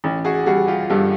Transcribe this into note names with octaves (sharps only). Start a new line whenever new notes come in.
A1
F#4 G#4
G3 F#4 G#4
F4 G4
G2 G4 A4